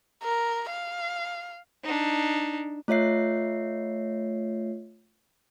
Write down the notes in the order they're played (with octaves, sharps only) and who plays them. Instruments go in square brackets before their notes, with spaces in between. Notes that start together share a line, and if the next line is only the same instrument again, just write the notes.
[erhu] A#4
F5
[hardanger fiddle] D4 D#4
[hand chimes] A3 F4 C#5 E5 C7